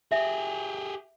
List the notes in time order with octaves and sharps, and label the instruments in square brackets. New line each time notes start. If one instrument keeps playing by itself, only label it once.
[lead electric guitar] G4 G#4 [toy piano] E5